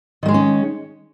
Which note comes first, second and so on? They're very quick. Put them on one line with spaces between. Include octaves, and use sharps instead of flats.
D#3 A3 G#3 D#4 C#4